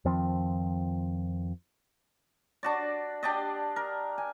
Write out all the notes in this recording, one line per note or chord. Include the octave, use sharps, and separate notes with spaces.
F2 D#3 F3 C4
D4 F#4 D5
D4 G4 D5 D#5
A#4
G#5